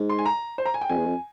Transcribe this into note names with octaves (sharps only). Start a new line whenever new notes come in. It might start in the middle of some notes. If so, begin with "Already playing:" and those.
Already playing: G#2
C6
G#5
A#5
C5
A#5
G#5
G5
F2 G#5
E2
F2